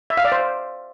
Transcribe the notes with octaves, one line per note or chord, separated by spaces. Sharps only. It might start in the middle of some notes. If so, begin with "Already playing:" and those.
E5
F5
D5
C5